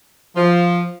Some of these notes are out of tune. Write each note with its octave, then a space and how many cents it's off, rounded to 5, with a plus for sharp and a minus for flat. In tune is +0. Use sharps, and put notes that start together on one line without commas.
F3 +0